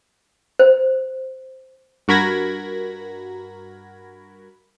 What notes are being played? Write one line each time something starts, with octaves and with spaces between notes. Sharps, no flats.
C5
G2 F#4 A#4 B5 G#6 A#6